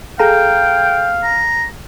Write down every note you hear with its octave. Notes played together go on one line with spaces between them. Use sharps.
G#4 A4 F5 G5 A#5
A#5